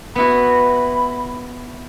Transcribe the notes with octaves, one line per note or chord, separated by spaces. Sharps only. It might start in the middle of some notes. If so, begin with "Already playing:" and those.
B3 E4 F#4 B5